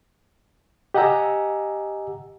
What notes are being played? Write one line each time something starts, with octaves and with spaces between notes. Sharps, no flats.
G4 D#5 F#5 G#5 A#5 E6